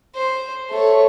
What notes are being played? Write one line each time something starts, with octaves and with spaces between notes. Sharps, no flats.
C5
A3 C#5